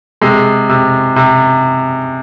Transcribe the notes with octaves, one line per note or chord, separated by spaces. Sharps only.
C3 G#3
C3
C3